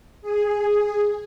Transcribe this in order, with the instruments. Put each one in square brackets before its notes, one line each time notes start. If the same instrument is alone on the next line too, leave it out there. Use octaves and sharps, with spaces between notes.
[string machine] G#4